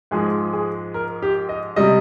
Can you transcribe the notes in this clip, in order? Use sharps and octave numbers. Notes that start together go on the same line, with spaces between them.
G#2 F3 G#3 G#4
G#4
A#4
G4
D#5
C3 G3 D#5